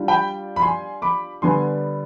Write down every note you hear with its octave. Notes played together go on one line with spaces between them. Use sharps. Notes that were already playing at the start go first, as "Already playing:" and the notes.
Already playing: G3 D4 F4
G5 B5
B5
G#5 C6
B5 D6
D3 G3 B3 D4 G#5 C6